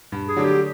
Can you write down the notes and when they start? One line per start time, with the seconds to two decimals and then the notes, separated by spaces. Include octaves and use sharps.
0.12 G2
0.28 G#4
0.36 D3 F#3 A3 D4
0.44 G4